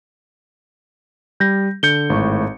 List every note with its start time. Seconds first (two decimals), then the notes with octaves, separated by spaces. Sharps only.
1.40 G3 G6 A#6
1.83 D3 G6 C#7 G7
2.10 G#1 A2 C#6